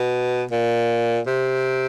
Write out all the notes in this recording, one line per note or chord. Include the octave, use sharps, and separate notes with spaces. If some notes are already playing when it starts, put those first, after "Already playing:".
Already playing: B2
A#2
C3